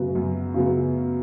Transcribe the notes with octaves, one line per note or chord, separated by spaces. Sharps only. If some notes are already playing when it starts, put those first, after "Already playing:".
Already playing: F#2 C#3 F#3 B3
F#2
C#3 F#3 B3